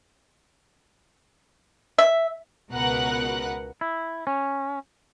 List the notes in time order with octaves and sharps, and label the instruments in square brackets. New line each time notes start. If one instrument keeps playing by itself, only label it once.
[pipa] E5
[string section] C#2 B2 A#4 B4 F#5 F#6
[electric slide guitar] E4
C#4